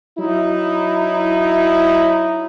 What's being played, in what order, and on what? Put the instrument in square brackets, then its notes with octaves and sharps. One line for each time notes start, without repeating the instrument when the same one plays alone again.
[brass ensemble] F#3 D#4 E4